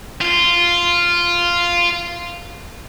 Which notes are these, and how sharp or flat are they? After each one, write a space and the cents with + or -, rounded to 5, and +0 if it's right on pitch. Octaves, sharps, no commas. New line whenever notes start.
F4 -5